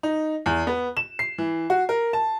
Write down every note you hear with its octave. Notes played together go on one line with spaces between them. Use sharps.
D#4
E2
B3
E7
C7
E3
F#4
A#4
A5